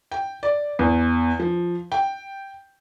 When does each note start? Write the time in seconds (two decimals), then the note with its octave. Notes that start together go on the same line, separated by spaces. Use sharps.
0.12 G5
0.43 D5
0.79 E2
1.39 F3
1.92 G5